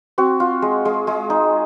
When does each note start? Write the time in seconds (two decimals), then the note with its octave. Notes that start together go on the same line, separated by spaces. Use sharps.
0.18 C4 F#4
0.40 F4
0.62 G#3
0.85 G#3
1.07 G#3
1.30 D#4